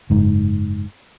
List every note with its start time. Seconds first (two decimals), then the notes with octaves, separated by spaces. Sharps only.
0.10 F#1 G#2